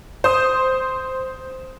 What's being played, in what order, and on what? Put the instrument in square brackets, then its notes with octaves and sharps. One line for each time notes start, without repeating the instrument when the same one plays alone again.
[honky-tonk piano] C5 C6 D#6